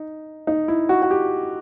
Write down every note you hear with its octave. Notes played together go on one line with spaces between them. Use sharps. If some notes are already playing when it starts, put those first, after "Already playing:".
Already playing: D#4
D#4
E4
F#4
F#4
G4